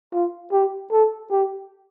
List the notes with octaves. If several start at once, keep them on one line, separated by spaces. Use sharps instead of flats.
F4
G4
A4
G4